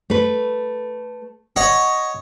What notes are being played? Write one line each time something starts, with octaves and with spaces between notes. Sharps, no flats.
A3 B4
C#5 D#5 F#5